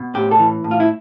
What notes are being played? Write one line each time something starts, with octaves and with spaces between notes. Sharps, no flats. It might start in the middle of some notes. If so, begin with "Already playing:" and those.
Already playing: B2
A2 G4
A4
E3
A2
F4
E4